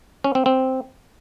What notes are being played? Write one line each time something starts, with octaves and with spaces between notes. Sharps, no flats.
C#4
C4
C4